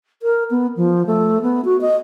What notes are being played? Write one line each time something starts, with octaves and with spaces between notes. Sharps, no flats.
A#4
B3
F3
A3
B3
F#4
D#5